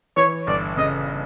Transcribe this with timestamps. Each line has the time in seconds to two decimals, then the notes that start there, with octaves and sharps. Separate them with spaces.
0.17 E3 C#5
0.47 G1 D5
0.77 C#3 D#5